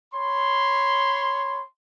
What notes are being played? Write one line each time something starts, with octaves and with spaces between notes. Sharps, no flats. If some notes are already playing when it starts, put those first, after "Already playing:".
C#5 B5 C6